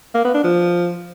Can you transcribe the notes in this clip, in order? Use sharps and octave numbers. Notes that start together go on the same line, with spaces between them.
A#3
B3
D4
F3